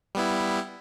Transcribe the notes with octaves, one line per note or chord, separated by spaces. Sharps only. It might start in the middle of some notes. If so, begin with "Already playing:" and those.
G3 B3 E4